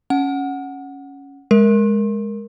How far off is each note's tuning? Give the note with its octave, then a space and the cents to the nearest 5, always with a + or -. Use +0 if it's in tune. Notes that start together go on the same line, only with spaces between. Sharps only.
C#4 +0 F#5 +0
G#3 +0 A#4 +0